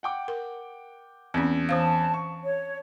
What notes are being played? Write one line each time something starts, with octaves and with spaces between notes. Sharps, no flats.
F#5 G5 D6
A#4
E2 C4 C#4
E3 C5 F5 A5
C#6
C#5